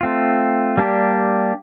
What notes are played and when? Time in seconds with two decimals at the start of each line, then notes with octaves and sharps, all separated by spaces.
0.01 A3 C4 F4
0.77 G3 A#3 D4 G4